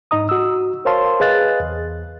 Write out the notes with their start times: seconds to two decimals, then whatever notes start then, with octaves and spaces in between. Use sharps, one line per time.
0.11 G#2 D#4 D#5 A#5 D#6
0.29 F#4 E6
0.85 A#4 C5 C#5 F5 A5 C6
1.20 G#4 B4 D#5 F5 F#6 A6
1.60 E2